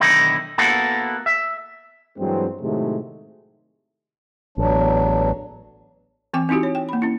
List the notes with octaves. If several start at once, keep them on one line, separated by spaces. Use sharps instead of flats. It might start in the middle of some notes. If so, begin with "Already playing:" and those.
B1 D3 D#3 D#4 E4
A#3 B3 E4 F#4 A4
E5
G2 E3 F#3 G#3 C4
A2 C3 D#3 F#3 G#3 A3
A1 E2 F#3 D4
E3 C4 G5 D6
C4 D#4 E4 F#4 G4
C#5
G5
A#3 B5
C#4 E4